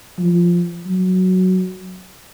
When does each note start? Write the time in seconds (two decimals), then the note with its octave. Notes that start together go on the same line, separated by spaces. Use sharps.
0.19 F3
0.86 F#3